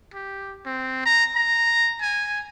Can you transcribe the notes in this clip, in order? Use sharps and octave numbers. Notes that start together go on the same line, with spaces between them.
G4
C4
A#5
A#5
G#5